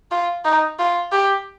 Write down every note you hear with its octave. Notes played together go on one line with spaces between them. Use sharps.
F4
D#4
F4
G4